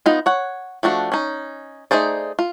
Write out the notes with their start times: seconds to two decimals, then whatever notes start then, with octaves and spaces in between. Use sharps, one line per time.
0.06 B3 D#4 F4
0.26 C#5 F#5
0.83 F3 A3 D4 F#4
1.12 C#4 D#4
1.91 A3 D#4 G#4 C5 D5
2.39 F4